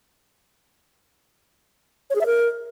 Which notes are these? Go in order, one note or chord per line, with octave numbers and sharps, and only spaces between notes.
C#5
G#4
E5
A#4